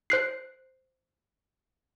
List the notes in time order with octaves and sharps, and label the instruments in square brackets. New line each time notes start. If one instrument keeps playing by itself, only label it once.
[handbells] C5 F#6 C7